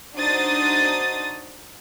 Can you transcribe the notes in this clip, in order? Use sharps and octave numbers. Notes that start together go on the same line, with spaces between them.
D4 D#4 F#4 C5 D#6 A6